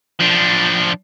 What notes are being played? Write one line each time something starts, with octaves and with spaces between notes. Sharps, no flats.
F3 D4